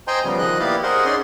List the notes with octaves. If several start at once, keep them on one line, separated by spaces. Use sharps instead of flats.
C5 D#5 G5 G#5 A#5 C6
C#3 F3 G3 B3
D#3 F3 D#5 F#6
A#3 B3 E4 G4 D5 F5
G#4 A#4 C5 D#5 F#5
C#4 D#4 G#4 D5 G#5 C6